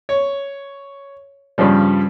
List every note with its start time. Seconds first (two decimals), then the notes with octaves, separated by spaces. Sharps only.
0.09 C#5
1.58 G2 C#3 F3 G3